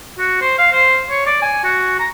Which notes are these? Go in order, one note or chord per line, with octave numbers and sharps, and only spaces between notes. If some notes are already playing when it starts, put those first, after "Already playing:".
F#4
C5
F5
C5
C#5
D5
G#5
F#4
A#5